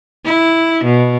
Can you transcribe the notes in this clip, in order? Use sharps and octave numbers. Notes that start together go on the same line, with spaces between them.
E4
B2